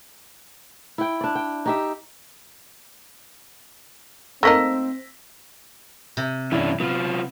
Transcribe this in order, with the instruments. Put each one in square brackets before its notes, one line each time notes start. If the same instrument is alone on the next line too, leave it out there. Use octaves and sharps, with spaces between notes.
[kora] E4 G5
D4 D5
G5
D#4 G4 E5
[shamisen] A3 A#3 D#4 [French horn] C4 [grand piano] E6 A#6 B6
[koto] C3
[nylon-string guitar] G2 E4 [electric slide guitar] E3 C#4 D4
[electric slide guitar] F#3 F4 [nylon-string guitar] B3